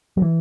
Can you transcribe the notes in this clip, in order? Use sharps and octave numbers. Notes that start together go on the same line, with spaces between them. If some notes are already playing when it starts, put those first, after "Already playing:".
F#3
E3